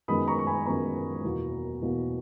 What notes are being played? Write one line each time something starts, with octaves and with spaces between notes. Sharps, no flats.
F#2 D#3 G#3 B3 B5 D#6
A#5 C#6
C#6
G#5 B5
F#2 D#3 G#3 B3 A#5 C#6
E2 B2 F#3 A#3
E2 B2 F#3 A#3